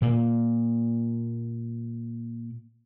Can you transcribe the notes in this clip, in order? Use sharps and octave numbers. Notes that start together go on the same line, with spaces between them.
A#2 A#3